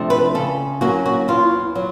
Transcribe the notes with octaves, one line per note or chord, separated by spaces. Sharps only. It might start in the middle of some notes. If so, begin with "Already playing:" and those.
Already playing: C3 F3 A3 D4
B4
C#3 A4
F#3 A#3 C#4 F#4
F#4
E2 F4
F#3